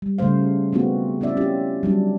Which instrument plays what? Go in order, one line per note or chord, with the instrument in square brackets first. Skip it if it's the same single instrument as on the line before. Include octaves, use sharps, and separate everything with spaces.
[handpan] G3
C#3 G3 A3 C5 F5
G#3 A3 B3 C4 F4 F#4
C4 C#4 E4 D5 E5
C#4 F4 G4
F#3 G3 D4